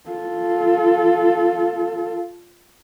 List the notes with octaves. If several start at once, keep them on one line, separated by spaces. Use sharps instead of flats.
F4 A4